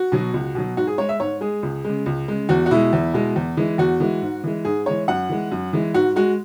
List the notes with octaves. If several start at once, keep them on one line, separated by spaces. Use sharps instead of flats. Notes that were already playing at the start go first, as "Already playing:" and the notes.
Already playing: F#4
B2 F#3
C#2
B2 F#3
G#2 F#4
G#4
G#3 C#5
E5
G#2 C#5
G#3 G#4
C#2
C#3 G#3
C#2
C#3 G#3
E2 F#4
F#4
B2 G#3 E4
E2
B2 G#3
E2
E3 G#3
E2 F#4
E3 G#3
G#2
E3 G#3
G#2 G#4
E3 G#3 C#5
F#2 F#5
E3 G#3
F#2
E3 G#3
G#2 F#4
G#3 F#4